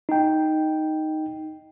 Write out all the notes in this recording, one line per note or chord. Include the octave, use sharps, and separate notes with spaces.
D#4 G5